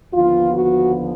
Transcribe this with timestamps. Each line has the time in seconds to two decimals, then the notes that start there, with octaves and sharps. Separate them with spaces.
0.13 D#2 D3 F3 B3 F4
0.52 F#4